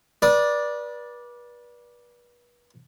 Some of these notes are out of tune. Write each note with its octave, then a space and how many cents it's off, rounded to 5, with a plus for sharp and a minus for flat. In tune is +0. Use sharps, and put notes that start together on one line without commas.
B4 -35 D5 +0 D#6 +5